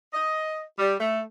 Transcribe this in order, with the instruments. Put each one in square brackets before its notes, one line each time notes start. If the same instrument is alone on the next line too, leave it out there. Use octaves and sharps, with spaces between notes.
[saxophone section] D#5
G3
A3